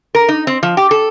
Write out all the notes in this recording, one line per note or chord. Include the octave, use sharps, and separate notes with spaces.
A#4
D#4
C4
F3
G4
A4